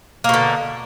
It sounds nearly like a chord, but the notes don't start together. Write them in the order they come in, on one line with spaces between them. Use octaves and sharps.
A#3 B2 D3